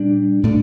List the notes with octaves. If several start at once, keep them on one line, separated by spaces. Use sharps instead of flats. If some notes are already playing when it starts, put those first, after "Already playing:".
Already playing: A#2 G3 D4
A2 A3 D4